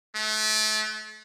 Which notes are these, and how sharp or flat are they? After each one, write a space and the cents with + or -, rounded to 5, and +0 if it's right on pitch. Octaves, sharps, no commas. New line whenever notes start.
A3 -35